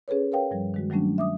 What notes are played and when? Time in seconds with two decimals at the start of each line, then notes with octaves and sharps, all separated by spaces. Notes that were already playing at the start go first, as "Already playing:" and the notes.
0.08 C#4 G#4 A4 B4 C#5
0.32 A#4 B4 C#5 F5 G5
0.51 G2 F3 G3
0.74 D#3 G#3 F#4
0.90 D#3 F#3 G3 A3 C#4 D4
1.18 E5 D6 D#6